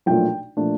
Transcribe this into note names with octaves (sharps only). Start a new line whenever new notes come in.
B1 A#2 F3 A3 D4 G5
A#2 F3 A3 D4